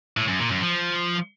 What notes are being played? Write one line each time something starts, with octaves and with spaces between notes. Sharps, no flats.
A2
F#2
A#2
F#2
F3